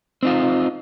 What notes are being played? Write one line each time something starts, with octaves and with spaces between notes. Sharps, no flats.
C4 D#4 F4